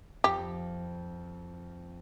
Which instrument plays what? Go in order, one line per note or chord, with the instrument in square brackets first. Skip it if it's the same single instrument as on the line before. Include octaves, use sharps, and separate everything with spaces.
[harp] F2 [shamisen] G4